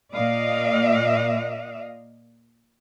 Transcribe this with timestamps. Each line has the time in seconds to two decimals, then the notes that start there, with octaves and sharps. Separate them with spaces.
0.11 A#2 D5 D#5 F5